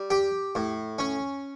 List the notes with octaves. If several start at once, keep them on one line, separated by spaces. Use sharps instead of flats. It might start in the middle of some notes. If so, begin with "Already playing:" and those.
Already playing: G3
G4
A2
C#4